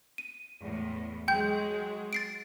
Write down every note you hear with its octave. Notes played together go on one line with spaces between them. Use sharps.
D#7
E2 A2
F#3 G#3 G5 G6
A6 C7 D7